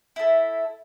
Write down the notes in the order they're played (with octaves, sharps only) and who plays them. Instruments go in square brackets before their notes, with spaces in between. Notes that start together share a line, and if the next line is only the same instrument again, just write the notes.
[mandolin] E4 A4